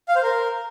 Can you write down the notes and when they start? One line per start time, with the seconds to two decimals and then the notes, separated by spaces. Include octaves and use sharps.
0.08 F5
0.16 C5
0.23 A#4